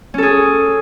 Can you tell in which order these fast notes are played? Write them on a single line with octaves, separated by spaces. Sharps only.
C#4 A4 G#4